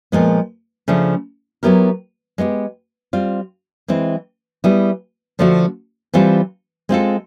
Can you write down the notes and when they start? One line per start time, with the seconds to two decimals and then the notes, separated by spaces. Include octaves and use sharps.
0.12 A#2 F3 G#3 B3
0.88 C#3 F3 A3 D4
1.63 F#3 B3 E4 G4 A#4
2.38 G#3 B3 E4 G4
3.13 G3 C4 F4
3.88 E3 G#3 C4 E4
4.64 G3 B3 E4 G#4
5.39 D3 F3 A3 D4 F#4
6.14 E3 G3 C4 F4 A4
6.89 G#3 C4 F4 A4